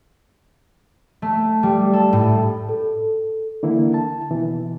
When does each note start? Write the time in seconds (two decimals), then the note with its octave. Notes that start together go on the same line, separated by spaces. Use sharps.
1.22 A3
1.63 G3
1.93 A4
2.13 A2
2.69 A4
3.63 D3 E3 A#3 E4
3.94 A5
4.31 B2 E3